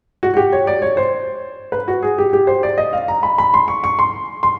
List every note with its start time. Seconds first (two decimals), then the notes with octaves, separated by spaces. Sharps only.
0.23 F#4
0.34 F#4
0.37 G4
0.52 C#5
0.67 D5
0.82 C#5
0.97 C5
1.72 B4
1.88 F#4
2.03 G#4
2.18 G4
2.33 G4
2.47 C5
2.63 D5
2.78 D#5
2.93 F5
3.08 A#5
3.23 B5
3.38 B5
3.54 C6
3.68 C#6
3.84 C#6
3.99 C6
4.43 C6